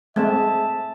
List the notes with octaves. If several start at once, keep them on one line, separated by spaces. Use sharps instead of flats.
G#3 A3 C4 E5 A5